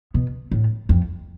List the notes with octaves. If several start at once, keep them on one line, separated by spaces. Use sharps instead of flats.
B2
A2
F2